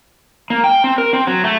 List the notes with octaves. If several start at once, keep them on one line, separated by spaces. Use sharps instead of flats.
A#3
G5
C4
A#4
C4
F#3
A3